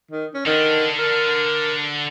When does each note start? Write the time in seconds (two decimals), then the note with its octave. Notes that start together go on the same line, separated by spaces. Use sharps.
0.11 D#3
0.34 C#4
0.46 D3 D#3 D4
0.98 A#4